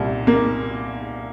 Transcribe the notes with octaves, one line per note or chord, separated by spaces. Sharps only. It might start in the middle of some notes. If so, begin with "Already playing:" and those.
Already playing: C2 A#2
A#3